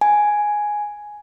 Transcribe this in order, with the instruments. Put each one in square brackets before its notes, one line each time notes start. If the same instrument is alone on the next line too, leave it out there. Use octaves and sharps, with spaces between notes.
[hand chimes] G#5